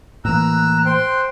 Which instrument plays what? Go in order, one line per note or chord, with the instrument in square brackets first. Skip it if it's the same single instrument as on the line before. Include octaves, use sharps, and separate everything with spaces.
[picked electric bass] A2 E3 A#3 [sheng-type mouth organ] A#5 E6 [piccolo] F#6
[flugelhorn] C5 [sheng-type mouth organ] G5 C6